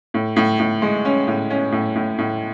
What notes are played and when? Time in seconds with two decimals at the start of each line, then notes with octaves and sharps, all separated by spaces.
0.14 A2
0.36 A2
0.60 A2
0.82 G#3
1.05 C#4
1.28 A2
1.50 C#4
1.72 A2
1.95 A2
2.18 A2